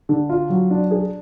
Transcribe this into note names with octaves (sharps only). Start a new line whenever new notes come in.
D3
F4
F#3
D4
G#4